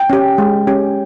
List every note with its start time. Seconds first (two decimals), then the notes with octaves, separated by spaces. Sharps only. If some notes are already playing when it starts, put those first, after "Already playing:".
Already playing: G5
0.10 C#4 G4
0.38 G#3
0.67 C#4 G4